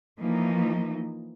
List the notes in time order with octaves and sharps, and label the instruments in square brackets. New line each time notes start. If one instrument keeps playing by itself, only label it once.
[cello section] E3 F3 A#3 D#4